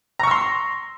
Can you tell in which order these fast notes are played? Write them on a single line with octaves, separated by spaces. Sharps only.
A#5 C#6 E6 C6